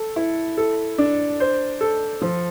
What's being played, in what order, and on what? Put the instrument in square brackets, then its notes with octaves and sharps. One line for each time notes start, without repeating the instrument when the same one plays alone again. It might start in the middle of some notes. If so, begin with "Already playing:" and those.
Already playing: [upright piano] A4
E4
A4
D4
C5
A4
F3